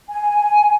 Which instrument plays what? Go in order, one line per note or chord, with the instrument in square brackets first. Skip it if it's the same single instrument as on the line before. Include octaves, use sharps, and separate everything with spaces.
[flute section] G#5